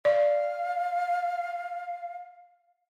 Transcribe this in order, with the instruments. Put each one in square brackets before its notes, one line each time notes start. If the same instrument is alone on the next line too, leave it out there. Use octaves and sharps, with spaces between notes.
[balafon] D5 [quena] F5